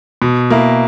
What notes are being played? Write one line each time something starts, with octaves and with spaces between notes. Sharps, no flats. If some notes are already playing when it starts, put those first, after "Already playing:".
B2
A#3 E4